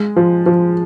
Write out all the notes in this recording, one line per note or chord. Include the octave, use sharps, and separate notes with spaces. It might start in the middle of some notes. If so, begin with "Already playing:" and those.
Already playing: G#3
F3
F3